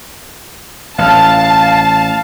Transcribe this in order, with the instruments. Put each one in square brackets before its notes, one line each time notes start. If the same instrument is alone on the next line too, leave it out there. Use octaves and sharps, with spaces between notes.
[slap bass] A1 [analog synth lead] F5 [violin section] A5